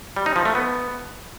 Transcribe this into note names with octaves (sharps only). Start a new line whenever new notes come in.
G3
D#4
F3
A3
B3